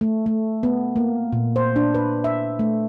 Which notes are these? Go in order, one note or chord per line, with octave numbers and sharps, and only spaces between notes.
A3
A3
B3
A#3
A#2
C5
D4
B4
E5
A3